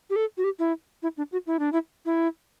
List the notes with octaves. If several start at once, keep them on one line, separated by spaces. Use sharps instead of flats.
G4
A4
F#4
G4
E4
E4
D4
F#4
E4
D4
E4
E4